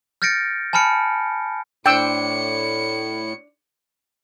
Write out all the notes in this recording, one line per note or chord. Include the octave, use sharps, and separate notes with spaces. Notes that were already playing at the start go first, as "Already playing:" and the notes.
F6 G6 A6 A#6 C#7 D7
G#5 A5 B5 F6 C#7 D7
A2 D4 C5 G5 E6 C#7